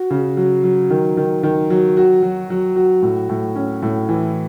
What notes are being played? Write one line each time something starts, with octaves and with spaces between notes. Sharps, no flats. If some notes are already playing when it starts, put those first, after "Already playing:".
Already playing: F#4
C#3
F#3
F#3
D#3
D#3
D#3
F#3
F#4
F#3
F#3
F#4
A2
A2
C#4
A2
E3